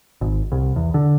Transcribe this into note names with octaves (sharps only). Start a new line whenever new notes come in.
G#1
C2
E2
D3